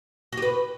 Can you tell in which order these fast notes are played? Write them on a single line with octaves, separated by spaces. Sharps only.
F#4 G4 B4